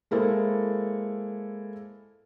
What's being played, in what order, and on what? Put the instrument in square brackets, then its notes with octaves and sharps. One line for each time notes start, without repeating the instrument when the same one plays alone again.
[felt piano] G#3 A#3 E4 A4 C5